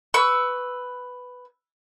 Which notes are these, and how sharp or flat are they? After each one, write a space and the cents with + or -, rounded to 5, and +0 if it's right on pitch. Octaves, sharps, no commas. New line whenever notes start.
B4 +5 C#6 +20 E6 +0